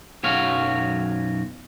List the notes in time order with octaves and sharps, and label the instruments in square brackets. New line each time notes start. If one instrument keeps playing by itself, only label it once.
[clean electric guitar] B1 F#2 F#4 C#5 F5